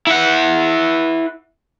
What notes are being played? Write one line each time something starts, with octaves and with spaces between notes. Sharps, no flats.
E4 F#5